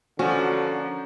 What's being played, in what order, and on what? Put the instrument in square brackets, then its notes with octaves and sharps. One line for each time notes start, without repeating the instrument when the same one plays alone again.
[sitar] A#2 F3 [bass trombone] D3 [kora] C#4 [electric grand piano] F#4